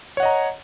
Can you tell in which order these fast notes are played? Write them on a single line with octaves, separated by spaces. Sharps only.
C#5 F#5 D#5 A#5